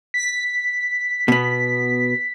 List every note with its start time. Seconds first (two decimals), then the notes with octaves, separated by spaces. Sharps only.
0.14 B6
1.28 B2 B3